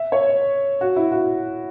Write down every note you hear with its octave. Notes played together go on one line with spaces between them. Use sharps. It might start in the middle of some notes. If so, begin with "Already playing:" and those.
Already playing: E5
C#5
F#4
E4
F#4